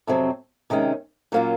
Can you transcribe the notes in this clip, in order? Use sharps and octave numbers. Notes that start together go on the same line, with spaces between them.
F2 C3 F#3 C4
C3 D#3 G#3 C#4
A#2 F#3 A#3 C#4 F4